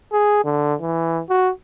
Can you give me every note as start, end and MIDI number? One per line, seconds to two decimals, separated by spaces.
0.13 0.41 68
0.44 0.75 50
0.81 1.21 52
1.29 1.50 66